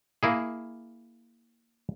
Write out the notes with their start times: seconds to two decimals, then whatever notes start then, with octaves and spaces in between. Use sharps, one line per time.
0.23 A#3 E4 G#4